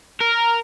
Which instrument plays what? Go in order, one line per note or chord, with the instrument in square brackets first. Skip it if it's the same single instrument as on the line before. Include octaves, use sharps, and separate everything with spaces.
[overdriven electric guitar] A#4